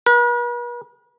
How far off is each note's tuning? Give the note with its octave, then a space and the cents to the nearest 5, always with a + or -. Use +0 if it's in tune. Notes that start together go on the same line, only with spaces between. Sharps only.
B4 -45